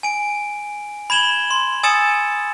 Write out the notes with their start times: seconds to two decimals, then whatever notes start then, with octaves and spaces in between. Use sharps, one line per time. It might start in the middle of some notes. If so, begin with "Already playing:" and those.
0.03 G#5 D7
1.10 B5 G#6 E7 F#7 G7
1.51 C6
1.83 G#5 D#6 E6 A6 C#7 E7